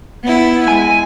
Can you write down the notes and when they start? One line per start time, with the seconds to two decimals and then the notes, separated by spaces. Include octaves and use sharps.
0.22 B3 E4
0.68 G#3 G#5